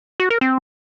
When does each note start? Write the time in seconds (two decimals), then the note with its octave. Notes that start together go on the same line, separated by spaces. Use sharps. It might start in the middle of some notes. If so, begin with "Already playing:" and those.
0.20 F#4
0.30 A#4
0.41 C4